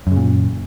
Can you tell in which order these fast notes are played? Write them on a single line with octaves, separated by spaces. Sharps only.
F#2 C#3 A#2